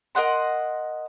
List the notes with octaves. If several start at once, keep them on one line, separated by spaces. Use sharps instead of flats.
A#4 D#5 F#5 C6